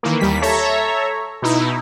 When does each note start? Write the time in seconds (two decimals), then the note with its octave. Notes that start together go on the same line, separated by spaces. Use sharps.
0.03 D#3 E3 A#3
0.20 D#2 G3 B6
0.42 A4 C#5 E5 A#5
1.42 B2 D#4 E4